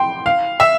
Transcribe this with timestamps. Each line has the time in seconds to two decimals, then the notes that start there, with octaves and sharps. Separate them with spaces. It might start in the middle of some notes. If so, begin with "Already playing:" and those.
Already playing: G5 C6
0.26 F5
0.60 E5